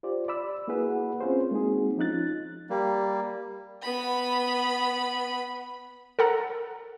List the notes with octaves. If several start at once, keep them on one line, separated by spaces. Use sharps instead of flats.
F4 G4 C5 D5
D5 B5 E6
A#3 E4 F#4 G#4 B4 F#5
C4 C#4 F4 G#4 C5
G#3 A#3 C4 D#4 F#4 G#4
F3 C#4 D#4 F4 F#6 A6
G3 A#3
B3 B5
A4 A#4 F#5 A#5